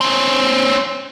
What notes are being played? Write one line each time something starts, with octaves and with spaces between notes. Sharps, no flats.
C4 C#4